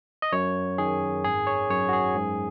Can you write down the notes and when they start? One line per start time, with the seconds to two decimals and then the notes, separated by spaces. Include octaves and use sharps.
0.22 D#5
0.32 F#2 C#5
0.78 D#3 G#4
1.24 G#1 G#4
1.47 C#5
1.69 F#2 C#5
1.89 F#4
1.93 G#4
2.15 G#2